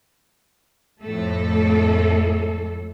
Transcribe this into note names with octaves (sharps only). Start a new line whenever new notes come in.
F2 A2 A3 A4